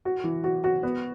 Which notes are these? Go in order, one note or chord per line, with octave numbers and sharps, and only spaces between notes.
F#4
E3
F#4
F#4
B3